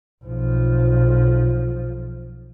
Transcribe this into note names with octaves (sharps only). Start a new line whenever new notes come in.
B1 F3